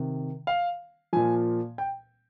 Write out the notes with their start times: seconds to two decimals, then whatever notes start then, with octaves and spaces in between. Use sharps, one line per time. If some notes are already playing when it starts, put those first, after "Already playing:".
Already playing: C3 D#3
0.47 F5
1.13 A#2 F3 G#5
1.78 G5